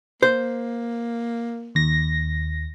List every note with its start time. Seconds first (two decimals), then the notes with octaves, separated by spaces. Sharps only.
0.23 A#3 C5
1.75 D#2 A#6